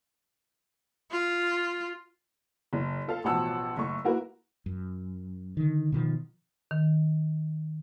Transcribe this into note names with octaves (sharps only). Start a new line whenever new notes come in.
F4
F#1
F4 A4 F5
A1 B2 F3 F#5 A5 E6
F#1 A3 C#6
A#3 E4 F#4 A#4 B4
F#2
D3 D#3
B2 D#3 F3
D#3